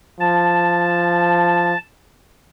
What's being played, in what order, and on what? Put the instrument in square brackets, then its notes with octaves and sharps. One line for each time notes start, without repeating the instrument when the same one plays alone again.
[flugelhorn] F3 [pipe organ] A5